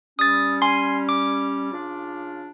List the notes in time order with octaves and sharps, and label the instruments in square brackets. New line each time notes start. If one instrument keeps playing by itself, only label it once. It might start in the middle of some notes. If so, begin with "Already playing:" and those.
[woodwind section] G3 C#4 [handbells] D#6 A6
[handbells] G#5 C6 C7
D6
[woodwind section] C#3 D4 F4